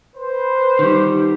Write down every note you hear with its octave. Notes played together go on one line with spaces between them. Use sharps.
B4 C5
D#3 G3